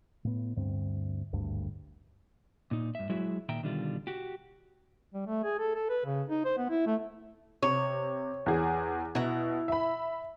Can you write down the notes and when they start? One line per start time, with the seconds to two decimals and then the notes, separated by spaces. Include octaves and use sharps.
0.25 A2 B3
0.56 D2 G2 C4
1.33 G#1 D2 G2
2.71 A#2 D#4
2.95 G2 E5
3.09 F#3 G#3 E4 F#4 G#4 E5
3.49 A#2 D#3 E5 G5 A#5
3.63 B2 D3 D#3 G3 F4
4.07 F#4 G4
5.14 G3
5.26 A3
5.44 G#4
5.59 A4
5.75 A4
5.89 B4
6.05 C#3
6.29 D#4
6.45 C5
6.58 B3
6.70 E4
6.86 A3
7.63 C3 C#5
8.46 E2 G#4
9.15 B2 E4 A#5
9.68 E5 B5